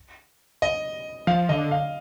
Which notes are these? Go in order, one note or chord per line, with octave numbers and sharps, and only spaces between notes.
D#5
F3 F5
D3 D#5
F5